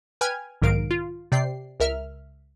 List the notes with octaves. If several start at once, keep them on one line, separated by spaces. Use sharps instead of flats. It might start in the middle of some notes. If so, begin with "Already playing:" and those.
B4 G5 G#5 F6 G#6
B1 G#2 D#3 A#4 F5 D7
F4
C3 D5 G5 C7
C#2 A#4 E5 F6